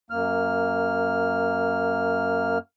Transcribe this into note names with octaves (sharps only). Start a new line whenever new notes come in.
F#2 A#3 F6